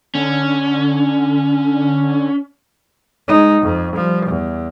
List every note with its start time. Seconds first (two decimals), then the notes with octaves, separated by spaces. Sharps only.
0.15 D3 C#4
3.28 G#3 D#4
3.62 F2
3.95 F3 G3
4.26 E2